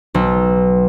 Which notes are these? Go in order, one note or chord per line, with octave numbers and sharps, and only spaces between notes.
B1